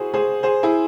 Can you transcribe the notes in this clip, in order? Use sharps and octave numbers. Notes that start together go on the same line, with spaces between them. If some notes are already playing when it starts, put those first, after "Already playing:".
Already playing: E4 F#4 G#4 C5
G#4 C5
G#4 C5
E4 G#4